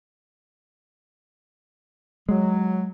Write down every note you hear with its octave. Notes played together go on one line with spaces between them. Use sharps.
F#3 G#3